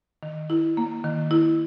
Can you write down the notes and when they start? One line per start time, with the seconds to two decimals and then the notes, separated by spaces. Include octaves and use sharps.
0.23 D#3
0.50 E4
0.77 A#3
1.04 D#3
1.31 E4